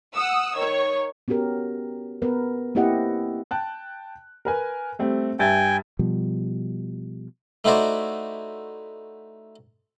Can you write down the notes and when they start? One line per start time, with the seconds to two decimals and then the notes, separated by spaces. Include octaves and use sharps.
0.15 F#5 D#6 E6
0.58 D#3 C#5
1.28 B3 C#4 F#4 G4 A#4
2.22 B3 A#4 B4
2.75 A#3 C4 E4 G4 D#5 F#5
3.51 G5 A5 F#6
4.45 A#4 B4 G#5
4.99 G3 A3 C4
5.39 G2 E5 G5 G#5 A6
5.99 B2 F3 G3
7.64 A3 D#4 E4 F#4 C5 D5